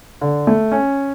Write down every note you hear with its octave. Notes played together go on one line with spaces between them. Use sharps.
D3
A3
C#4